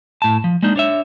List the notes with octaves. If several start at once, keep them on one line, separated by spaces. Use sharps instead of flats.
A2 A5
F3
G#3 A#3 D4 D#4
D4 C#5 E5